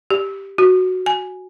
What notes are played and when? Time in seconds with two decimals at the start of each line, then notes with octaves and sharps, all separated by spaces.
0.10 G4
0.58 F#4
1.06 G#5